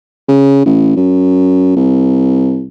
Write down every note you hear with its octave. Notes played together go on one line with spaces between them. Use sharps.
C#3
A1
F#2
C2